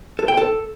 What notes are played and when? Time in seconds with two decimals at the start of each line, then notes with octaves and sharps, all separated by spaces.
0.19 A4
0.28 G5
0.37 A4